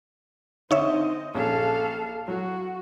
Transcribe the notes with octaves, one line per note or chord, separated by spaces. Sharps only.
D3 C4 D#4 C#5 D#5 E5
A#1 C#4 A4 F5
F#3 F#4